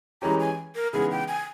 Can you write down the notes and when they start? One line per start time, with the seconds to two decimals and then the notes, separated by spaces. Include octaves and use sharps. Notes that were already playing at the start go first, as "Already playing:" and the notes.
0.22 E3 G#3 C#4 G4 A#5
0.40 G#5
0.75 A#4
0.93 C#3 E3 G#3 B3 D#4 G#4
1.11 G5
1.28 G#5